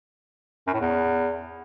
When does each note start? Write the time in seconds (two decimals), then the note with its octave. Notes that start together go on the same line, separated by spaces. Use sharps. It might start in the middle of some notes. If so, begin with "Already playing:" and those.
0.67 F#2
0.74 A2
0.81 E2